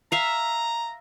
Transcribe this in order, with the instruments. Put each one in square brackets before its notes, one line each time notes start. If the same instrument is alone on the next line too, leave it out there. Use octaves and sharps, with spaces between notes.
[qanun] E5 F5 [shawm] A#5